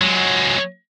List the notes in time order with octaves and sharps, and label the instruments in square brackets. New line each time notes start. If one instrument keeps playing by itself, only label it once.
[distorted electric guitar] F#3 G#3